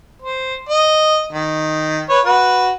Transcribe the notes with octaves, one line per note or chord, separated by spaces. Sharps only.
C5
D#5
D#3
B4 C#5
F#4 B4